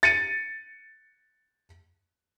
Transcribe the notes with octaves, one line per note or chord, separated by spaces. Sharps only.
A6 C#7 D#7